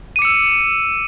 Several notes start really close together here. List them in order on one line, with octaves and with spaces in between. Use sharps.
D#7 D6 C#7 E6